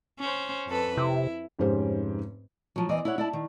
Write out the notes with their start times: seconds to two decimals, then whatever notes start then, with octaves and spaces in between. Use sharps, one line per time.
0.20 C#4 C5
0.68 F2 A4 B4
0.97 C3 E4
1.59 F1 G#2 C#4 G4 C5 C#5
2.76 F3 F#3
2.89 E2 E3 C5 D5 D#5
3.05 E4 C#5 F#5
3.18 E4 D5 A5
3.33 D#3